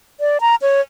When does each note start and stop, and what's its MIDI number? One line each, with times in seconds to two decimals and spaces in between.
0.20 0.38 74
0.41 0.55 82
0.62 0.81 73